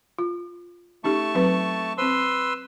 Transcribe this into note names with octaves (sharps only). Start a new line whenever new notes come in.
F4
A3 C#4 D#4 G4 A5 C#6
F#3 C4 B4
C4 B4 C5 C6 E6